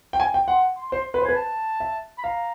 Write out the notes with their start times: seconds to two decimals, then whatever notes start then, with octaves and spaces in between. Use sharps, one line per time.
0.13 G5
0.20 G#5
0.34 G5
0.48 F#5 C6
0.77 C6
0.92 C5 C6
1.14 B4 C6
1.22 C5
1.25 G#5
1.29 B4
1.36 A5
1.80 E5
2.18 B5
2.23 F5 A#5